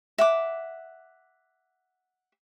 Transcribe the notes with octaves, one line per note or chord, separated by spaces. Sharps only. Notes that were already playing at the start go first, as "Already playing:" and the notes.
E5 F#5 D6